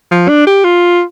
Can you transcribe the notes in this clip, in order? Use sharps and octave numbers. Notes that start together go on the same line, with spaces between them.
F3
D4
G4
F4